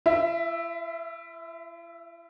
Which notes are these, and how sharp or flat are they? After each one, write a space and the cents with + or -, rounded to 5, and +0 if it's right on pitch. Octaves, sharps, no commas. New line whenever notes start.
E4 +45 E5 +0